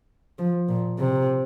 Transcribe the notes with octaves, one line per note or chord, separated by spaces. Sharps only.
F3
A#2
C3